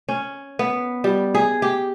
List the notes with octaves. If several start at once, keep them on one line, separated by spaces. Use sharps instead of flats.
C#4
B3
G3
G#4
G4